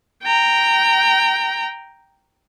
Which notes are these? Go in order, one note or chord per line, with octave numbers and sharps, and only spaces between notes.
G5 A#5